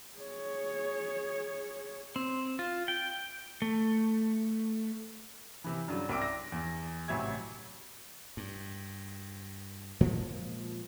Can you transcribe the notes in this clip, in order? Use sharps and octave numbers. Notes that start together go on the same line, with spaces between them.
G#4 C#5
C4
F4
G5
A3
C3 E3
G2 C#3 F#3
C2 C4 D4 G5 D6 D7
A#6
E2
A1 C3 F#3 E5 G#5 G#6
G2
A#2 F3 G#3 A#3